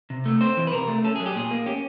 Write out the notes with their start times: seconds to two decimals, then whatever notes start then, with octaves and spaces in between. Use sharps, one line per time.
0.10 C3
0.25 A3
0.41 C4 C5
0.57 E3
0.67 B4
0.73 C3 A#4
0.88 A3
1.04 C#4 A4
1.16 F#3 G#4
1.26 G4
1.36 A#2 G#4
1.51 A#3
1.66 C#4 G4